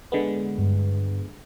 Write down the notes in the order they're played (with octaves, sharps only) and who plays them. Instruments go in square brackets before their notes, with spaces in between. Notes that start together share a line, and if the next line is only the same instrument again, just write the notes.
[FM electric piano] D3 G#3 B3
[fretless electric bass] G2